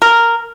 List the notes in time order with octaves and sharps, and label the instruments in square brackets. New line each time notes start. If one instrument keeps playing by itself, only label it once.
[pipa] A#4